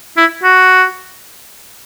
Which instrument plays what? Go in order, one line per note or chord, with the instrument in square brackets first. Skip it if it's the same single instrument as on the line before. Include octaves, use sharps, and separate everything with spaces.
[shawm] E4
F#4